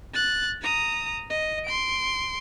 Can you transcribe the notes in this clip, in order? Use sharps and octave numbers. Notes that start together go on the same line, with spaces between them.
F#6 A6
A#5 D#6
D#5
C6 D7